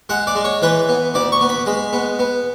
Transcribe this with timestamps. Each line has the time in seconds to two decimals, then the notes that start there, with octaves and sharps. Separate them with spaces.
0.09 G#3 F#5
0.27 D5
0.35 G#3
0.45 C#5
0.62 E3 B4
0.89 B3
1.14 D2 D5
1.32 C#6
1.41 B3
1.49 B5
1.66 G#3 B5
1.93 B3
2.19 B3